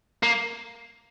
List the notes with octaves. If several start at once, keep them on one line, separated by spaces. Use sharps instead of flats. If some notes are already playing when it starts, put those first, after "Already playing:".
A#3